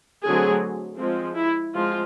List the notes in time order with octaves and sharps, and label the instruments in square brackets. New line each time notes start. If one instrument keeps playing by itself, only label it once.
[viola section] D3 F#3 A3 C4 G#4
F3 G#3 C4
E4
F3 G#3 C4 F4